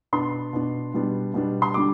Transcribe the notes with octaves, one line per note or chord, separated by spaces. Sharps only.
B2 B3 D4 C6
B2 B3 D4
B2 G3 B3 D4
B2 G3 B3 D4
C6
D3 G3 D4 D6